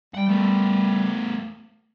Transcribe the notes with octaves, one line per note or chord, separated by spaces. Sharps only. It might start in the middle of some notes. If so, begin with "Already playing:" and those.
G3 F#5 G5
A3 B3